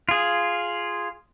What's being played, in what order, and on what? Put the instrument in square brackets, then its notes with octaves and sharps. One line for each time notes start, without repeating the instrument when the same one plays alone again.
[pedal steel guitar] F4 G#4